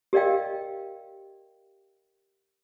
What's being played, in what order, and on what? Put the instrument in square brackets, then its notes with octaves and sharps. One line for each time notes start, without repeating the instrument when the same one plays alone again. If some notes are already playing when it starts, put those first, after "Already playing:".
[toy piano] G4 A#4 D5 D#5 F5 G5